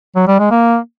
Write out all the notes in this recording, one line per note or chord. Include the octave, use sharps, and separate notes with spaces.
F#3
G3
G#3
A#3